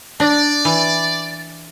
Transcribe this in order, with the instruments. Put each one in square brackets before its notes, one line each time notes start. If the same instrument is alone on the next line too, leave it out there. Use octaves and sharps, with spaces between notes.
[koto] D4 [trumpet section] D5
[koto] E3